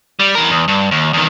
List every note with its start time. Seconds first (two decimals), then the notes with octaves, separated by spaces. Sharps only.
0.20 G3
0.35 E3 A#4
0.50 E2
0.68 G2
0.91 D#2
1.13 E2 D#3